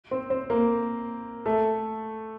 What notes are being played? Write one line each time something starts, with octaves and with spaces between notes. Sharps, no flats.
C4 C5
C4 C5
A#3 A#4
A3 A4